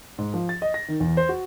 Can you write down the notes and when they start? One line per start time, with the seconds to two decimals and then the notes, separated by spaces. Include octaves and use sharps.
0.18 G#2
0.34 F3
0.49 A6
0.62 D#5
0.74 A#6
0.88 D#3
1.00 E2
1.17 C5
1.29 F#4